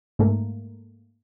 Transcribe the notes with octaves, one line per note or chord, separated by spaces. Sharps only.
G#2 A3 A#3